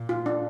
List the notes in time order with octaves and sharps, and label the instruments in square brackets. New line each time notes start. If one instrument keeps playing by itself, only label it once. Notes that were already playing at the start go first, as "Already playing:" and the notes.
Already playing: [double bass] A#2
[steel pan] F4
D4